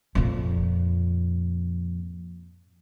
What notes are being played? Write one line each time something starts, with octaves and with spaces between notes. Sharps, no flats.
F2 A#2